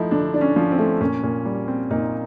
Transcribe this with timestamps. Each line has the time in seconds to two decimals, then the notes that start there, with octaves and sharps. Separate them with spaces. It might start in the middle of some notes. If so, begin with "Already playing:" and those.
Already playing: F3 A3 D#4 E4
0.11 D3 D4
0.34 D4
0.41 C#4
0.56 F3
0.71 C4
0.79 A3
1.01 A#2 C#4
1.23 A#2
1.45 G3
1.68 C4
1.91 A#2 D#4